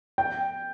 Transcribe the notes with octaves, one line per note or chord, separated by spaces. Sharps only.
G5